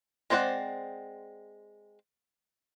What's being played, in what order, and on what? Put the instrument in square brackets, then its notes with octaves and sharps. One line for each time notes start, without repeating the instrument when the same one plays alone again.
[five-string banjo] G#3 C4 C5 D5 F#5